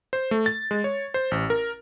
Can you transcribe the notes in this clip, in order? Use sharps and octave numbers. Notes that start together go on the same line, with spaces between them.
C5
A3
A6
G#3
C#5
C5
A1
A#4